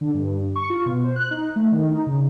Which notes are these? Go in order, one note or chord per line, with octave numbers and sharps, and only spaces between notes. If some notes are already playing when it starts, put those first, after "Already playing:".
D3
G2
C#6
F4
B2
C5
F#6
D#4
A3
D#3
D#4
C#3